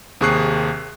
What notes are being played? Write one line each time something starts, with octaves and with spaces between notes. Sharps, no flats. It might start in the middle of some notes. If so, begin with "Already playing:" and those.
D#2 C3 G#4 C#6 F#6 C7